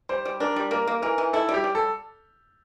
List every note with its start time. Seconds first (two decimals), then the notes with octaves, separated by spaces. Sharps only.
0.09 G3 C5
0.25 G3
0.40 D4 A#4
0.56 G3
0.71 A#3 A#4
0.87 A#3
1.02 E3 A#4
1.18 E3
1.33 E4 A4
1.49 G3
1.54 G4
1.64 G3
1.75 A4